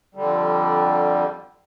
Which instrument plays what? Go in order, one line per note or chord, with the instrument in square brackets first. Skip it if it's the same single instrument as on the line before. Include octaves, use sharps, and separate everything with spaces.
[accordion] F2 D3 G3